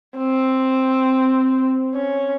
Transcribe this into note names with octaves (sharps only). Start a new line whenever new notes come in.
C4
C#4